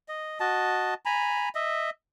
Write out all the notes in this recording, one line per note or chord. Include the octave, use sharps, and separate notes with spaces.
D#5
F#4 D#5 A5
G#5 A#5 B5
D#5 E5